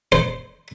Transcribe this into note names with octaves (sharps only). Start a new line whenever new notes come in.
C5